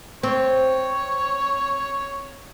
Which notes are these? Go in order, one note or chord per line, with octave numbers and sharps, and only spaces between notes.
C4 C#5